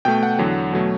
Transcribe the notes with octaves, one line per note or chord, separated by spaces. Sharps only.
B2 A3 G5
F#5
E2 D3 F#3
B2 F#3 A3